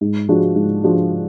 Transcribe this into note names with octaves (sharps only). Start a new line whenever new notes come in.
G#2
F3 G#3 D4 F#4
G#2
F3 G#3 D4 F#4